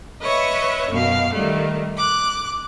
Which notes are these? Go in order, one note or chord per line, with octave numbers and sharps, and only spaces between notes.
B4 C#5 D#5 E5 C#6
F#2 B2 F5
D#3 G3 A3
D6 F#6